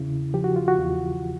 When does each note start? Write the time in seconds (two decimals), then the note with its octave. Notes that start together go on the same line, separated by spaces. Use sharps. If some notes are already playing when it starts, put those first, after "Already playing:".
Already playing: E2 C#3 E4
0.34 F3 G4
0.44 F#4
0.56 F4
0.68 F#4
0.78 E2